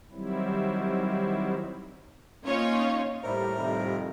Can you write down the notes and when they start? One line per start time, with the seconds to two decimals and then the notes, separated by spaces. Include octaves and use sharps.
0.12 D#3 F#3 G3 C4 E4
2.44 A#3 C#4 D#4 F4 C#5
3.23 A2 G3 A#4 C5 E5 B5
3.57 F2 C3 D#3